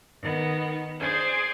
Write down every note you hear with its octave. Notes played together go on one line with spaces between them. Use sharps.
D#3 B3
G#4 C5 D5 G#5